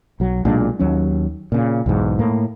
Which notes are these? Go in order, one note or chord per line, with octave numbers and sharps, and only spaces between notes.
B1 F#3
B1 A#2 G#3 D4
D#2 F#3 C#4
A#2 C#3
B1 E2 G#2
A2 A#3